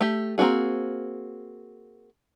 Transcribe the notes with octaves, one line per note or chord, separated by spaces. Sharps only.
A3 G4
A#3 C4 D4 F#4 G#4